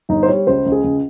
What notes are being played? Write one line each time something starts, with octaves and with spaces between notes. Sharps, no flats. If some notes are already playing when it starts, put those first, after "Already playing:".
G1 D#4
C5
G3 C#5
C#2 C5
C#2
G#4
C#2